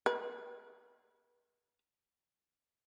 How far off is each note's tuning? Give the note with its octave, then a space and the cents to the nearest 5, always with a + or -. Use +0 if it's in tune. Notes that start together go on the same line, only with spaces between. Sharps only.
B4 -40